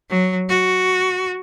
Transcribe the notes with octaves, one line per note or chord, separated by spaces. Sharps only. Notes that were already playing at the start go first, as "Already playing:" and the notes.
F#3
F#4